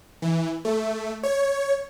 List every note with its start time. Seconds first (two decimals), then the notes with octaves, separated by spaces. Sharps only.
0.22 E3
0.65 A3
1.23 C#5